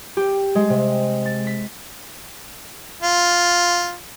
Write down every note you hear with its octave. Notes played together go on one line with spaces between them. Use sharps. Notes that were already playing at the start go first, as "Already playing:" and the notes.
G4
G#3
C3
A6
B6
F4